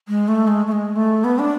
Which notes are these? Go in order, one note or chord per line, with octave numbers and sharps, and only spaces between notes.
G#3
A3
G#3
A3
G#3
A3
B3
D4